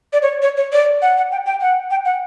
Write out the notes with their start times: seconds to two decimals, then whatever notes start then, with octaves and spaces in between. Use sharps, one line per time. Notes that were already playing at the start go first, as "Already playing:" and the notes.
0.13 D5
0.22 C#5
0.42 C#5
0.57 C#5
0.72 D5
1.02 F#5
1.17 F#5
1.32 G5
1.46 G5
1.61 F#5
1.91 G5
2.05 F#5